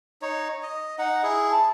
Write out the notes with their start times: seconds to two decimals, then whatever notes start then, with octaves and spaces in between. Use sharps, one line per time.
0.22 D#4 C#5
0.63 D#5
0.98 D#4 F#5
1.23 E4 G#4
1.51 A5